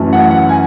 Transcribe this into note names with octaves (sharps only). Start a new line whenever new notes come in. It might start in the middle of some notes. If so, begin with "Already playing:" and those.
Already playing: F#2 E3 A3 C#4
F#5
F#5
G#5